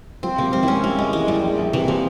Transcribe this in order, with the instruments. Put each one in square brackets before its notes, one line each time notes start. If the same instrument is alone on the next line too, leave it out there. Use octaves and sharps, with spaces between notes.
[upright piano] F3 [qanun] C4
[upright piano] C3 [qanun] A#3
[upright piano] G#1 [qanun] C4
[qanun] E4
[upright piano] G#1 [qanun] C#4
[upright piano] C2 [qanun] A#3
[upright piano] C2 [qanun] G#3
[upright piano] E3 [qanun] G#3
[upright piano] E2 [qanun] G3
[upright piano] A#1
A#1
[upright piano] C3 [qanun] E3
[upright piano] C3 [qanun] F3